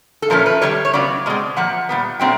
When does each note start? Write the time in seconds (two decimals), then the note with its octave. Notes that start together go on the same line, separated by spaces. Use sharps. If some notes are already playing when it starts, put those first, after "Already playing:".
0.22 A4
0.30 A#2 F3 A3 C#4 A#4
0.46 B4
0.61 C3 E3 G3 C#5
0.85 C#5
0.94 C#3 F#3 B3 D5
1.26 B2 G#3 C4
1.56 A#2 F3 A#3 F#5
1.89 A#2 G3 B3
2.20 A#2 F#3 A3 C4 G5